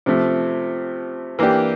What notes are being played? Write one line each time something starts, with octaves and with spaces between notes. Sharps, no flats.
C3 F3 A3
E3 A#3 D4 G4